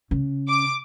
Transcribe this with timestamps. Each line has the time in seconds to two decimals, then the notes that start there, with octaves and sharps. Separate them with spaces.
0.11 C#3
0.49 D6